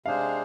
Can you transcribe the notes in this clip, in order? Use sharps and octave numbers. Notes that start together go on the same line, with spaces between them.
C3 G#3 D4 G#4 C5 F5